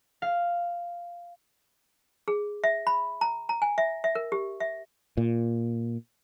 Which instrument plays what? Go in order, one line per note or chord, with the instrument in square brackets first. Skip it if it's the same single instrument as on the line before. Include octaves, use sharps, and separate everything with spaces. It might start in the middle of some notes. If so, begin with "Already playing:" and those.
[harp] F5
[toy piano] G#4
E5
B5
A#5
A#5
G#5
E5
E5
A#4
G4
E5
[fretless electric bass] A#2